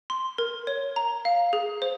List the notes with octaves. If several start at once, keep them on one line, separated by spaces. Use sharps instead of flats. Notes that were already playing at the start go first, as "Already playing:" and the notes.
C6
A#4
C#5
A#5
F5
G#4
C5